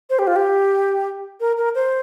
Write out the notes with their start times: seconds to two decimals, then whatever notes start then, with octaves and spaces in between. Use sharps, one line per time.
0.10 C5
0.19 G4
0.27 F4
0.36 G4
1.40 A#4
1.57 A#4
1.75 C5